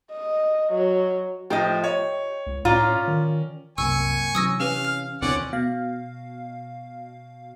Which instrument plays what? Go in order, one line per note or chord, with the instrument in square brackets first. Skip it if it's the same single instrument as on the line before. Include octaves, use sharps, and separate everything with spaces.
[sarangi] D#5
F#3
[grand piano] A2 F3 [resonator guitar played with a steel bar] G4 D#5
[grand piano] C#5
[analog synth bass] C#2
[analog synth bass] A2 [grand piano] C#4 D5 A#5 [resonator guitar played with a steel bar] F4
[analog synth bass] D#3
[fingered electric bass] C2 [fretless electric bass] F#2 C3 A#3 [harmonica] G#5 C#6 [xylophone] E6
[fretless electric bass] C3 E3 [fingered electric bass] F#3 C#4 [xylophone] D#6 E6 A#6
[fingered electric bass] C#4 [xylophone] G4 B4 G#5 [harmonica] F5
[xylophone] F6
[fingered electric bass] D#2 C4 [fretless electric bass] B2 D3 E3 [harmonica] C#4 D5 F#5
[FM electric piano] B2 F5